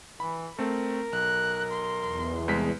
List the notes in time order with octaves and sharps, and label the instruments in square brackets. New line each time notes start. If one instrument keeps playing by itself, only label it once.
[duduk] E3 [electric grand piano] B5
[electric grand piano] A3 C4 [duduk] A#4
[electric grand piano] B1 [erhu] F#6
[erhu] C6
[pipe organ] E2
[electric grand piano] C2 G#3 B6